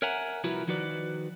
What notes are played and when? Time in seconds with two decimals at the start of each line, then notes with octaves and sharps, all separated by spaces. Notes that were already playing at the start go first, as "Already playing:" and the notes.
0.02 A#4 C#5 E5 F#5 G#5 A#5
0.44 C2 F3 E4 F#4 A#4 B4
0.67 D#3 F3 F#4 B4 D5